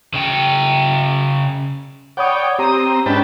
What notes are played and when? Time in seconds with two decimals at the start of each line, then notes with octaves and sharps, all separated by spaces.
0.13 C#3 G5
2.17 C#5 D5 F#5 G5 B5 D#6
2.59 C4 G4 A#5 D#6
3.06 G#2 C#4 D4 B4 G5 A5